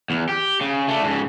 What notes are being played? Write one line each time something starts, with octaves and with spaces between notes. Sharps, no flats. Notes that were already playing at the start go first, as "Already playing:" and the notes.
E2
G4
C#3
A3 D4
G#2 C#3